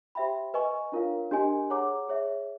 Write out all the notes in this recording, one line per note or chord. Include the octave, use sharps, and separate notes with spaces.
G4 C5 E5 G5 B5
B4 D#5 G#5 C#6
D4 F4 A#4 C#5 F5
D4 G4 A#4 D#5 G#5
G#4 C#5 F#5 A#5 D6
G#4 C#5 E5